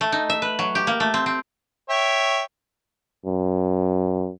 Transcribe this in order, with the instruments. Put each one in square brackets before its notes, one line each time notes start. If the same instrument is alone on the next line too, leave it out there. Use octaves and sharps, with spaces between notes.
[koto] A3
D#4
E5
B4
F#3
G4
A#3
A3
C4
C4
[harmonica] C#5 E5 G5
[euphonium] F#2